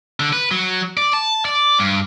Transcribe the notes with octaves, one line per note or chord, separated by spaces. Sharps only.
D3
B4
F#3
D5
A5
D5
G2